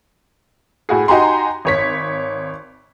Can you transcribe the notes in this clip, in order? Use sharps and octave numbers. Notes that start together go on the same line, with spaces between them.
A2 F#4 G#4
D#4 F#4 G4 G#5 A#5 C6
G#1 C#5 B6